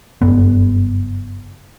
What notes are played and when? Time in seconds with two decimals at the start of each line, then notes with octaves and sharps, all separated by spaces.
0.22 F#1 G2 B3